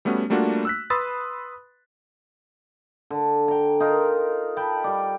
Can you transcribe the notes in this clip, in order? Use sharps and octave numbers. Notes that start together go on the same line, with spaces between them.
G3 A3 B3 C#4 F#4
G3 A3 A#3 D4 F4 F#4
E6 F#6 B6
B4 B5 C6 D#6 E6 A6
D3
G5 A#5
D#4 F4 A#4
G5 A5 B5
G3 D5